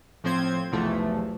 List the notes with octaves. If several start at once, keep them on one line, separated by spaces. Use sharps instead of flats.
A2 F3 C4 C5 G#6
B1 E2 C3 E3 F3 A3